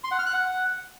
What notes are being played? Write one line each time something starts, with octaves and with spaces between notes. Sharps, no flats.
C6
F#5
F6
F#6
F#5